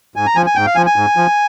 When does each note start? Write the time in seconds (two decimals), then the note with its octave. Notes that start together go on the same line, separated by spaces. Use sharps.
0.16 G#2 G#5
0.26 A#5
0.36 F3 G#5
0.46 G#5
0.56 G#2 G5
0.66 F5
0.75 F3 G#5
0.86 G#5
0.96 G#2
1.17 F3